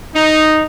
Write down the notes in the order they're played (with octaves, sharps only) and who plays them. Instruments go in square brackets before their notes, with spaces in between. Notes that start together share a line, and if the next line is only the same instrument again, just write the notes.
[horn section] D#4